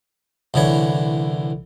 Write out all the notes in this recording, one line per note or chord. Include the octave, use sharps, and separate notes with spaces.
C2 D3 E3 C#5